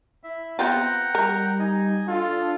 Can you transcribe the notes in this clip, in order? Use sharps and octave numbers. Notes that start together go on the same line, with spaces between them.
E4 E5
B3 C4 F4 F#5 G5 A#5
G3 A#4
D#4 D#5 G#5
D4 F4 A4